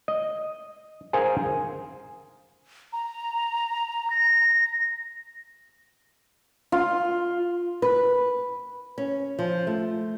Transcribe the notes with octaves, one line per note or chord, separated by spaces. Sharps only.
D#5
G#4 A#4 C5 F5 G#5
A#5
A#6
F4
B4
C#4
F3
A3